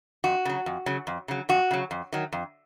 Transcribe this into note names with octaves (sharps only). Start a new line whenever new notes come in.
F2 F#4
C#3 F#3
F2
C#3 F#3
F2
C#3 F#3
F2 F#4
C#3 F#3
F2
D#3 F#3
F2